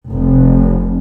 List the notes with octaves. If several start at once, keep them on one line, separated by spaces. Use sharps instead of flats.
F1